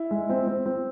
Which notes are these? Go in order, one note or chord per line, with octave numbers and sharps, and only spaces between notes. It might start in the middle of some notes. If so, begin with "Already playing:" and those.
Already playing: E4
G#3
C4
C4
C4